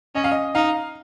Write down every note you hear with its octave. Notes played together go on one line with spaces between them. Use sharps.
C#4 D#5
F5
D#5
D#4 F5